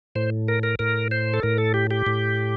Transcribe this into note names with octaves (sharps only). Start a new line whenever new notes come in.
A2 C5
A#4
A#4
A2 A#4
C5
A4
A2 A#4
A4
G4
G4
A2